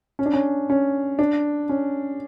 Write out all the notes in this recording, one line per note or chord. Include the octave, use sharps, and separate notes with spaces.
C#4
D4
C#4
C#4
D4
C#4